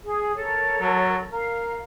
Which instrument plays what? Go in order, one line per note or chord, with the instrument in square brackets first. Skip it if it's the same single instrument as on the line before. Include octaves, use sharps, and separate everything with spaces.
[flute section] G#4
A4 A#4 C#5
[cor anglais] F#3
[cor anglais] A#4 [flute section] F5